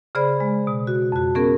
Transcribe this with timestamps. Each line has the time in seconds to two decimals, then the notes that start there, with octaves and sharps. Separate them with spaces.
0.15 C#3 G#4 C5 D5 B5
0.40 G#3
0.67 B2
0.87 F#4
1.12 F2 F#4
1.35 B3 C#4 G#4 A#4